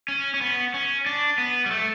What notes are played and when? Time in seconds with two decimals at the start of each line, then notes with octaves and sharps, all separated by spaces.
0.08 C#4
0.34 C#4
0.41 B3
0.74 C#4
1.06 D4
1.38 B3
1.66 G3
1.71 A3